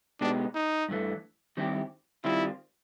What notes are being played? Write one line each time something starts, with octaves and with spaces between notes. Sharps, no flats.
B2 G#3 B3 D4 D#4 G4
D#4
G2 E3 A3
D#3 G3 C4 E4 G4
D#3 G3 C4 E4 F4